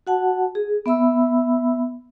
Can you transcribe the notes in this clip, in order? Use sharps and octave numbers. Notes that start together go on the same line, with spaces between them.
F#4 F#5 A5
G#4
B3 E5 B5 E6